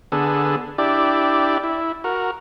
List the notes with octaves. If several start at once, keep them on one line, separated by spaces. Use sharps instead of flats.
D3 B3 G#4 A4
D4 E4 G4 D5
E4
F#4 A#4